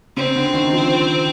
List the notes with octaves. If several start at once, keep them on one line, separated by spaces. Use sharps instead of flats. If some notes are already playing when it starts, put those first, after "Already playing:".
C#3 C4
D3
D#3
F3